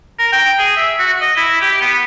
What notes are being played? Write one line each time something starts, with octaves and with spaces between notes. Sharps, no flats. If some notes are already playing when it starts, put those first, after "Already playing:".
A#4
G5
G#4
E5
F#4
D#5
E4
G4
B3